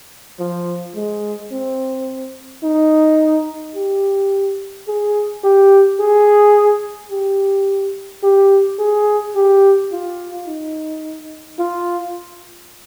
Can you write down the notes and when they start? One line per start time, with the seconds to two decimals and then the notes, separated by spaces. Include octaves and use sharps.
0.40 F3
0.96 G#3
1.52 C4
2.63 D#4
3.75 G4
4.88 G#4
5.44 G4
6.00 G#4
7.11 G4
8.23 G4
8.79 G#4
9.35 G4
9.92 F4
10.47 D#4
11.59 F4